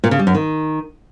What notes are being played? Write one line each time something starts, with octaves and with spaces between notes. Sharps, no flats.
A#2
C#3
G3
F#2
D#3